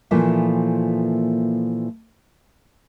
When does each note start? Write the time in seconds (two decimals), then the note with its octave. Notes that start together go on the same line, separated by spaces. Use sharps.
0.11 A#2 E3 F3 A3 A#3